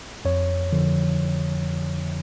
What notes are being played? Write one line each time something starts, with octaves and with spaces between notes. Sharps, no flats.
F2 C#5
D3 F3